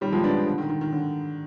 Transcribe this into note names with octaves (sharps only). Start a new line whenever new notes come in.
D#3 G3
F3 G#3
B3 D4
D3
D#3
D#3
D#3
D3